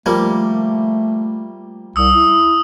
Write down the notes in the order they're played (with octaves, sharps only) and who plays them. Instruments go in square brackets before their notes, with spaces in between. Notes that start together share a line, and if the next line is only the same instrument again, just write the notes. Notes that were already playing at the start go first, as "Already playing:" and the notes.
[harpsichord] F3 G3 A#3 [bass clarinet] A3
[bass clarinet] C2 [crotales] D#6 E6
[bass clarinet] E4